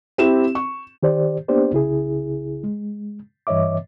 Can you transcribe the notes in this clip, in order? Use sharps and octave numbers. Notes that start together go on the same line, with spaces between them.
C4 E4 G4 E7
C#6
D#3 G4 C5 D5
A#3 B3 D4 G4 C5 D5
C2 C#3 E4 G#4
G#3
G2 E3 C#5 D#5 E5 D6